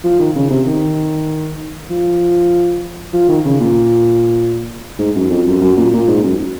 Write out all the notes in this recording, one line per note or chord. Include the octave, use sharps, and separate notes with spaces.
F3
D#3
C#3
C3
D#3
F3
F3
D#3
C#3
A#2
G#2
F#2
F2
F#2
F#2
A#2
A#2
G#2
F#2